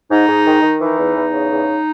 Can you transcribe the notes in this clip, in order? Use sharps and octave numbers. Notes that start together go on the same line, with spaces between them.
G#2 D#4
G#2
D#3
D#3
E3 D#4
E2
E2
C#3
E2